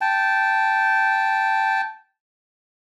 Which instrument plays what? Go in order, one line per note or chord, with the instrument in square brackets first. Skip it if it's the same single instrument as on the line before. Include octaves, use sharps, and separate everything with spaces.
[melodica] G5 A5